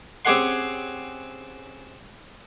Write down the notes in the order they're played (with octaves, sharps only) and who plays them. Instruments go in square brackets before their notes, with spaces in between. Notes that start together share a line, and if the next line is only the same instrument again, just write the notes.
[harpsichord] C4 C#4 G4 G#4 F#5 C6